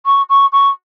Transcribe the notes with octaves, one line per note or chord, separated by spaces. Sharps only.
C#6
C#6
C#6